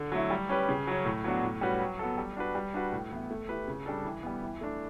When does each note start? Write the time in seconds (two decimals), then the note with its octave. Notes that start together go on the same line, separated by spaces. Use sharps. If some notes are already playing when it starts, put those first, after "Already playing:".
Already playing: D3
0.12 F#3 A3 E4
0.30 G3
0.49 C#4 G4 B4
0.69 C#3
0.87 F#3 C#4
1.05 A2
1.24 F#3 B3 D4 F#4
1.43 A2
1.61 G3 C#4 F#4 B4
1.81 F#3
1.99 B3 F#4 A4
2.18 G3
2.36 D4 F#4 B4
2.55 G3
2.74 D4 F#4 B4
2.92 A2
3.11 E3 B3 E4
3.30 A3
3.49 E4 G4 B4
3.68 C#3
3.86 G3 D4 A4
4.05 E3
4.23 G3 B3
4.42 E3
4.61 A3 D4